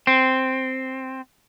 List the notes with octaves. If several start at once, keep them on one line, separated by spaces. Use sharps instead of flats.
C4